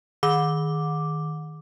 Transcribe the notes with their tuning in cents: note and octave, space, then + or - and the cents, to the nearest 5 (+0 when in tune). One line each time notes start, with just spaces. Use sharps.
D#3 +0 D6 +0